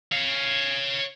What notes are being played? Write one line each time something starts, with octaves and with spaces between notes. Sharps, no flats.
C#5 F5